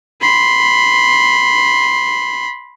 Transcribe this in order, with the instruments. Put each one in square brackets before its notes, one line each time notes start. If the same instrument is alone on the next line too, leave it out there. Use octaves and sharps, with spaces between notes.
[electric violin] B5 C6